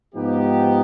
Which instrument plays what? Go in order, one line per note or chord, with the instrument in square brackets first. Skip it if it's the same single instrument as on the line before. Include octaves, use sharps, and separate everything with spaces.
[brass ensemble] G#2 F3 B3 D#4 G4